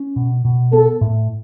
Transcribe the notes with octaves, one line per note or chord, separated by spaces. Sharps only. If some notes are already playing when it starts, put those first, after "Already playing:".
Already playing: C#4
B2
B2
B3 A4
A2